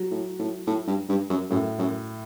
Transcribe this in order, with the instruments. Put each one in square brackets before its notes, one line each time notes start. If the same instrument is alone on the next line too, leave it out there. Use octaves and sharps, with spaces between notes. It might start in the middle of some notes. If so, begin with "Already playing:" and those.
Already playing: [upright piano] F#3
[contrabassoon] A2
A2
A2
G2
G2
F#2
[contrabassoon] F#2 [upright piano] A2
[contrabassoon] F#2